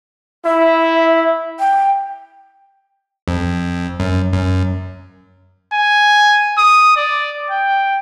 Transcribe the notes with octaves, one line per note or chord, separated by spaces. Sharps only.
E4 E5
G5
F2
F#2
F#2
G#5
D#6
D5
G5